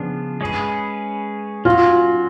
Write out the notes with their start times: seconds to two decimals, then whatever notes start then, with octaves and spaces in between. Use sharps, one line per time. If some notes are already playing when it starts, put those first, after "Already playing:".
Already playing: C#3 F3 B3 D4 F4
0.41 G#3 C#4 G#4 B4
1.65 F#3 C#4 F4 F#4